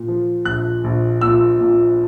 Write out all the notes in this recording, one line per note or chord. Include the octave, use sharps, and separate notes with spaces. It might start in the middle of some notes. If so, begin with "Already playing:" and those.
Already playing: A#2
F3
A#1 F#6
A#1
A#2 E6
A#2